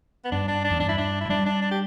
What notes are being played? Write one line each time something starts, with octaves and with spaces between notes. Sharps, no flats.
B3
G2 D4
D4
D4
E2
G2 D4
E4
D4
E4
G3 D4
D4
D4
G4